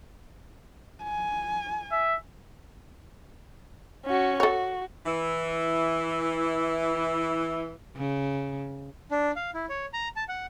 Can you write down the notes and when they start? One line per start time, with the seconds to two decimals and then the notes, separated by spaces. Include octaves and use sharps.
1.04 G#5
1.92 E5
4.05 C#4 F#4
4.40 F#4 A4 C#5
5.06 E3 E4
7.96 C#3
9.11 D4
9.36 F5
9.54 E4
9.69 C#5
9.93 A#5
10.16 A5
10.29 F#5